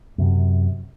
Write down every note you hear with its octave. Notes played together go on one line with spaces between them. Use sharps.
F#2 C3